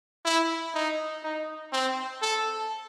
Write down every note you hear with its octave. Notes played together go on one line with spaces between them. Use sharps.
E4
D#4
D#4
C4
A4